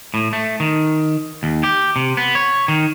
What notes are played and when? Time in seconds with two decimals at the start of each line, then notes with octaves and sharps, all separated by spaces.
0.14 A2
0.33 A3
0.60 D#3
1.43 D#2
1.63 G4
1.96 C3
2.17 B3
2.35 C#5
2.68 D#3